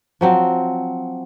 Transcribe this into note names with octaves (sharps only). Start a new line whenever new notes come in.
F3 F#3 C4